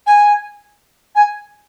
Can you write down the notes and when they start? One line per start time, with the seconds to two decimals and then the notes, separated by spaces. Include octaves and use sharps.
0.06 G#5
1.15 G#5